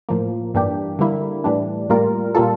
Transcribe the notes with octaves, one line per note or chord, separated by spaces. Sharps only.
A2 F3 A#3
G2 E3 A#3 D4 G4
D3 G3 A#3 E4
A2 E3 G3 D4
A2 G3 A#3 F4 A#4
A#2 G3 A#3 F4 A4